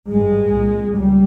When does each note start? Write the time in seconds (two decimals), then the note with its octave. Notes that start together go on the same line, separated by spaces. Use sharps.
0.10 G#1 G2 G#3
0.53 C2 A#2
0.96 C#2 G3